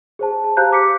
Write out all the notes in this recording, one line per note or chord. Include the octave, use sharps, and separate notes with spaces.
G#4 C5 A5
A5
G4 C5 F5 A#5 F#6 G6
D6 B6 C#7